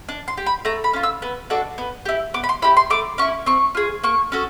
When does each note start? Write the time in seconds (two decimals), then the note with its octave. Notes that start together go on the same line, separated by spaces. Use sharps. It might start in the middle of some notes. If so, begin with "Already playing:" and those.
0.09 D4
0.28 C6
0.37 G4
0.46 B5
0.65 A3 A#5
0.84 B5
0.93 C#4 F4
1.03 E6
1.22 B3
1.50 D4 F#4 A4
1.78 B3
2.05 E4 G4
2.34 B3 D6
2.44 B5
2.49 C6
2.62 E4 G4 B5
2.77 C6
2.90 A3 D6
3.18 C#4 E4 C#6
3.46 C4 C#6
3.75 F4 G#4
4.03 A#3 C#6
4.32 C#4 F#4 A4